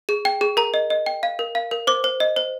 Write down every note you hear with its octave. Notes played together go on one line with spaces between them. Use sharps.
G#4
G5
G#4
A#4 A#5
D#5
D#5
G5
F5
A#4
F5
A#4
C5 D6
C5
D#5
C5